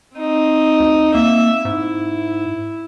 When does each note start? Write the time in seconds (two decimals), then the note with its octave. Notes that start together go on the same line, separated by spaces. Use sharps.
0.16 C4 D#4
0.80 D2
1.15 A#3 E5
1.65 G#2 E4